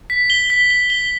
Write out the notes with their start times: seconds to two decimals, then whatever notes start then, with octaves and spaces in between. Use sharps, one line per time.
0.10 B6
0.30 G7
0.50 B6
0.70 G7
0.90 G7